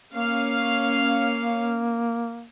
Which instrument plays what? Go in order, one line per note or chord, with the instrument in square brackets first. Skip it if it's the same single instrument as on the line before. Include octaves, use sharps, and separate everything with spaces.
[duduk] A#3 [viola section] C#4 F5